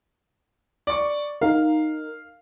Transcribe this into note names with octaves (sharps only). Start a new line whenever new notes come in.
D5 C#6
D#4 A#4 F5